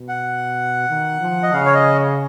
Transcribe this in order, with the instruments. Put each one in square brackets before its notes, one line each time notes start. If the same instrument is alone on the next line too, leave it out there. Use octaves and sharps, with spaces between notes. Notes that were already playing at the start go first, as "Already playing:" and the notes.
Already playing: [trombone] B2
[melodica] F#5
[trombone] D#3
F3
[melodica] D#5
[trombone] C#3 [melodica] F5
[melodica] C#5
D#5